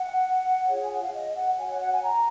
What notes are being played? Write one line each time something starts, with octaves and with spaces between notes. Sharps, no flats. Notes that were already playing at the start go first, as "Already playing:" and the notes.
Already playing: F#5
F4 G#4 C#5
G#5
F#5
F5
D#5
F#5
F#4 C#5 G#5
F#5
F#5
G#5
A#5